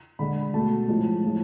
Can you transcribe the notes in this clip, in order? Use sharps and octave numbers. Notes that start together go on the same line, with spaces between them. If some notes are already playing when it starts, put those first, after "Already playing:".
D3 G#3 B5
B2 A3 A5
A2 F3 G#3
A2 F3 G#3